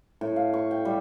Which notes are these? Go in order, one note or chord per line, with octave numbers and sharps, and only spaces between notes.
A2
F5
C#6
G5
G3